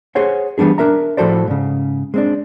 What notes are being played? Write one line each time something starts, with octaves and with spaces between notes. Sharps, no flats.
G#4 C5 C#5 F#5
E3 G3 B3 D4 G#4
D4 A#4 E5 A#5
A2 F3 F#4 A4 C5 D5
G#2 C#3
G#3 C4 D4